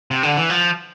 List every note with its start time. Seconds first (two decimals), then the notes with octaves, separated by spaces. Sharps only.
0.11 C3
0.23 D3
0.37 E3
0.50 F3